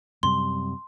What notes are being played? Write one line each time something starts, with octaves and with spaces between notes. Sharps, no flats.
F#2 C3 G3 C6